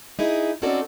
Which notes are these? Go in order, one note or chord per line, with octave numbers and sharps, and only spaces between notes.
D#4 E4 G#4
C4 C#4 D#4 F#4 A4 D5